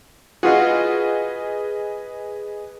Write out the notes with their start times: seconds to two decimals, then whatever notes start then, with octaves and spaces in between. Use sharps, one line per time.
0.43 F4 F#4 G#4 B4 D#5